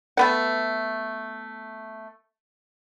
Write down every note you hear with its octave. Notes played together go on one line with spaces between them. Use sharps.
A3 B3 F#5